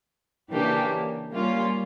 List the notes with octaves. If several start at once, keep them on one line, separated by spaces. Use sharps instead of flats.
C#3 E3 A#3 D4 G4
G3 A#3 C#4 F4